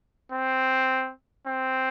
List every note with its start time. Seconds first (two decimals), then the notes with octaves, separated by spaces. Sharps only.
0.32 C4
1.47 C4